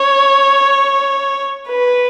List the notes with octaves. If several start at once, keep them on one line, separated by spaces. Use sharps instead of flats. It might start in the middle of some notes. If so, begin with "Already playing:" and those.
Already playing: C#5
B4